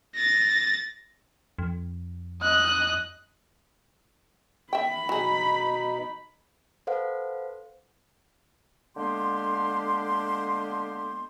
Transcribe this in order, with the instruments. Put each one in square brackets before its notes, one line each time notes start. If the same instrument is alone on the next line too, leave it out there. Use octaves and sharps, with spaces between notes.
[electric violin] A6 A#6
[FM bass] F2
[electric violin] D#5 F#6
[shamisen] E5 G5 [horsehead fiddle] B5
[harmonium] B2 D#4 [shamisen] F#3 G#4
[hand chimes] A4 B4 C5 F5 F#5
[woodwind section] D3 G#3 A#3 B3 G4 C6